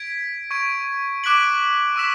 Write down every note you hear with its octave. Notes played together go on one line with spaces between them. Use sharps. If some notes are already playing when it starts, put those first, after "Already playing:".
Already playing: G#6 B6 D7
C#6 G#6 D7
D6 F#6 B6 D7 F#7
C#6 E6 B6 E7